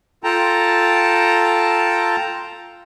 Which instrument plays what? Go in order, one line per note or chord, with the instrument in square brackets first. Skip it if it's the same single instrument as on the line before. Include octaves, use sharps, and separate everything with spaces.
[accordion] F4 A4 G5 A5 A#5